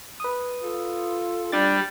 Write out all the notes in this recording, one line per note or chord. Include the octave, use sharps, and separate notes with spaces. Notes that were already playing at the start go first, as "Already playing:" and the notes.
B4 D#6
F4 A4
G3 D4 A6